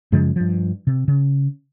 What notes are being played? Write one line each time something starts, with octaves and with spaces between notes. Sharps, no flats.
F#2 C#3 F3 G#3
G2 F3
C3
C#3